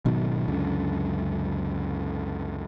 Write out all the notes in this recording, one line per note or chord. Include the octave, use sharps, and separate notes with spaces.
G#1 B2 D#3 F#3
C#2 F#2 D3